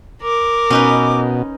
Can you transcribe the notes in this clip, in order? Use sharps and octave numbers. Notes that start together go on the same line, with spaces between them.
A#4 D6
B2 C#4 D#4 B4